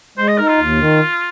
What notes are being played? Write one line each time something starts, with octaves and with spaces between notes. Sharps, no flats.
G#3 C5
D#5
D#4 A#4
F4
D#2
D#3